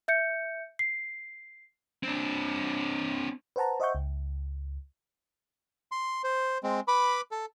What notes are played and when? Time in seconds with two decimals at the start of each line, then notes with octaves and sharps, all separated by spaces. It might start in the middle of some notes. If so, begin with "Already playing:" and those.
0.08 E5 G6 C#7
0.79 C7
2.03 C4 D4
3.56 B4 C5 F#5 A5 A#5
3.80 C5 D#5 E5 F#5 C#6 G6
3.95 C#2
5.92 C6
6.24 C5
6.63 G#3 C4
6.88 B4 B5 D6
7.31 A4